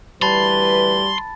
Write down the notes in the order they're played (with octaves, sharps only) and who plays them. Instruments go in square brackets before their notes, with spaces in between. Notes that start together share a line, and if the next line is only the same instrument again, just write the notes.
[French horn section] D2 E3 B4 [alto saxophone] G3 [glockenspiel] A5 B5 A6 [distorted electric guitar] C6